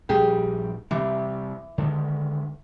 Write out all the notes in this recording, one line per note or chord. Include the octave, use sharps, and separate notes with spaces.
A#1 G3 G4 G#4
C3 E3 G3
D3 D#3 G#3